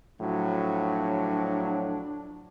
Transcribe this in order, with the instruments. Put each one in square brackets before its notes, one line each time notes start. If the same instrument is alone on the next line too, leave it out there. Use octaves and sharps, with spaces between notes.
[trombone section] A2 F3 F#3 [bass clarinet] D4